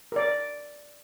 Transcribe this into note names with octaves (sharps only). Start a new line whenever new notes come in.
A#4 D5